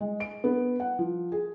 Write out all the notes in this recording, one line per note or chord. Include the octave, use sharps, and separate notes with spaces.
G#3
D7
B3
F#5
F3
G#4